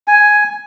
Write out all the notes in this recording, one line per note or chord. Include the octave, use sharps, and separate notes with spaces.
G#5